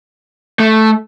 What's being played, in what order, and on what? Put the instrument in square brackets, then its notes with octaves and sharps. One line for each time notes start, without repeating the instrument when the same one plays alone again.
[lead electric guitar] A3